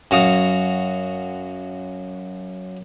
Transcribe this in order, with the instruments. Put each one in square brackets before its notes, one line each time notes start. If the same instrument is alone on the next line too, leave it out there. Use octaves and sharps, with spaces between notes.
[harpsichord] F#2 F#4 F5 D#6